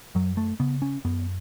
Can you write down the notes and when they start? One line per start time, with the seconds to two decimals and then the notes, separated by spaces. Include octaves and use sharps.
0.15 F#2 F#3
0.37 A3
0.60 C#3 B3
0.82 C#4
1.05 F#2 B3